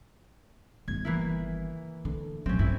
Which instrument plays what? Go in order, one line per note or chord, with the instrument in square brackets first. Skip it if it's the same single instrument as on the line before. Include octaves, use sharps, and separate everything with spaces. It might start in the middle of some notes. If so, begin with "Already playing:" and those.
[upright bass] G1 D#3 [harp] G#6
[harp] E3 A#3 E4
[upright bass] D3
[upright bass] A#2 F#3 [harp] C4 C#4
[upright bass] G2 [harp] E4